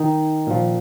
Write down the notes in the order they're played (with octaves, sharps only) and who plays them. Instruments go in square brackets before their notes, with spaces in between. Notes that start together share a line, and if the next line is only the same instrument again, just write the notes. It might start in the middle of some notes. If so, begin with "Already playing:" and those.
Already playing: [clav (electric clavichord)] D#3 D#4
A#2 F3